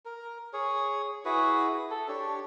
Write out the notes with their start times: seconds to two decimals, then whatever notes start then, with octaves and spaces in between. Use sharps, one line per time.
0.05 A#4
0.53 G#4 C#5
1.25 E4 F#4 G#4 B4
1.90 A4
2.08 D4 G4 C#5